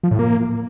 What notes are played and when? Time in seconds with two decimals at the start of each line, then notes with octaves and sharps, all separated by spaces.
0.03 F3
0.11 A2
0.19 A#3